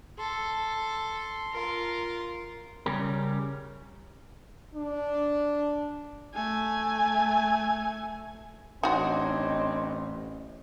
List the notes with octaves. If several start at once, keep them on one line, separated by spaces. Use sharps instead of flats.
A4 C6
F4 A#4
C#3 G3 C#4 G4 A#4
D4
A3 G#5
A1 C4 D4 D#4 F#4 C5 C#5 D#5